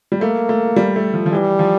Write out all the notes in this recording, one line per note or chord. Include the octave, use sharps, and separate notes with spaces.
G3
A3 A#3
A3
G3
A3
F3
F3
E3 G3
F3